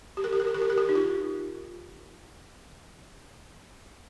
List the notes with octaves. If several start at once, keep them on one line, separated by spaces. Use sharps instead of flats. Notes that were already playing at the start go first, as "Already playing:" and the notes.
G4
A#4
G4
A#4
G4
A#4
G4
A#4
G4
D#4
F4